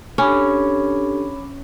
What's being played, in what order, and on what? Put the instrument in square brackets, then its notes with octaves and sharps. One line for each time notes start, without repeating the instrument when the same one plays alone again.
[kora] C#4 [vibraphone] D4 G4 A4 [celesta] C#5 B5 D6